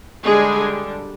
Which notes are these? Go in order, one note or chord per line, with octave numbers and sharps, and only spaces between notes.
D3 G3 G#3 D4 G#4